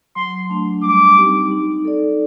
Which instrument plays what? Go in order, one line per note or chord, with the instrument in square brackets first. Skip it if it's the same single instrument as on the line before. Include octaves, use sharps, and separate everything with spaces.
[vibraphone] F#3 [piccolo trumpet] C6
[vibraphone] A3 D4
[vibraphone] G3 [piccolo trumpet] D6
[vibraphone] C4 D#4 G4
D#4
A4 D5